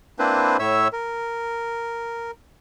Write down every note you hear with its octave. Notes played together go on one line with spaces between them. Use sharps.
A#3 C4 D4 E4 B4 C5
A2 C#5 E5 E6
A#4